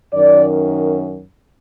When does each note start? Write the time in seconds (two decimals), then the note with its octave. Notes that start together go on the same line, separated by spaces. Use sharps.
0.13 F#2 D#3 D5